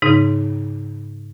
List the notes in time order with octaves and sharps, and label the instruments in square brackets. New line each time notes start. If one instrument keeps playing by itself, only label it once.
[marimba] G#2 C#3 D#4